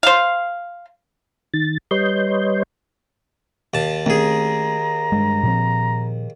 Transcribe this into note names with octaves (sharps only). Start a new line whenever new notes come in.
C5 F5
D#3 A6
G3 B4 C#5 D#5 C6 G6
D#2 A5
D#2 A3 C4 C#4 G#4 A#5
G2 G#3
A#2 F3 C4